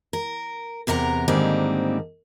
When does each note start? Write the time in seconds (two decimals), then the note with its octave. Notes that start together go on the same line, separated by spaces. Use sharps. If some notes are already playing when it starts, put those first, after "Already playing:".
0.13 A#4
0.87 E2 C3 A#4 F#5 A#5
1.28 G#2 D3 D#3 G3 A#3 C4